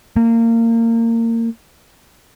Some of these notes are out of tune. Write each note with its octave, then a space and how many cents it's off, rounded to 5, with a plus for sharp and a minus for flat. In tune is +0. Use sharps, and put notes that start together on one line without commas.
A#3 -25